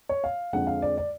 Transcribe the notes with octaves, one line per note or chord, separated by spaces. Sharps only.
C#5
F5
F2 D3 F3 G#3 F#5
F5
D5
D5